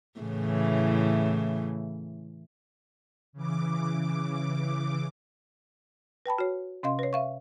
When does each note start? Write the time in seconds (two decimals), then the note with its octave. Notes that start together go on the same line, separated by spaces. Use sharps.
0.20 A2 C#3 E3
3.33 C#3 E3 D6
6.26 B4 G5 A5 B5
6.38 F#4 C#5
6.83 C3 C#4 D#5 F5 C6
6.99 B4 C#5
7.13 E5 F5 C#6